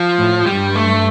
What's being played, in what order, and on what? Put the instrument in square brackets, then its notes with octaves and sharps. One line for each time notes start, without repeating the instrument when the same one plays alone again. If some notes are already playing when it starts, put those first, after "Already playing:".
Already playing: [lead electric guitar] F3
[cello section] A2
[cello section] G2 [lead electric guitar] G3
[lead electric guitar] A3